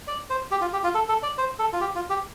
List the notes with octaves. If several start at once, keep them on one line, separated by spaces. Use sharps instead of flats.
D5
C5
G4
F4
G4
F4
A4
A4
D5
C5
A4
F4
G4
F4
G4